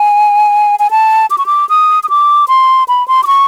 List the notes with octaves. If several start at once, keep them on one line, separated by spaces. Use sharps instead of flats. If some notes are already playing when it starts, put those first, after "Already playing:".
Already playing: G#5
G#5
A5
D6
C#6
D6
D#6
D#6
D6
C6
B5
C6
D6
C#6